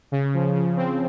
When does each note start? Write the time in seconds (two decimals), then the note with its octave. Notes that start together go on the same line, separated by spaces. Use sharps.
0.12 C#3
0.34 F3
0.55 C#3
0.77 C4